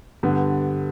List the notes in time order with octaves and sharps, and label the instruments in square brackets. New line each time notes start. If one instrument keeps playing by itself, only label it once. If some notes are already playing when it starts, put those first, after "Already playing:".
[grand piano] G2 D3 G3 B3